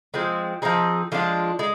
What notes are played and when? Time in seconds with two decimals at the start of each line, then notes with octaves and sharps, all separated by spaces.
0.14 F3 G#3 C4
0.62 F3 C4 D#4 G#4
1.12 F3 G#3 D4 F4
1.59 G#3